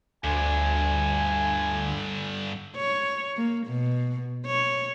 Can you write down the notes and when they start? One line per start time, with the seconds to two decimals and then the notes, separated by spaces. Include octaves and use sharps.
0.24 D2 G2 D3 G#5
2.77 C#5
3.37 A#3
3.67 B2
4.46 C#5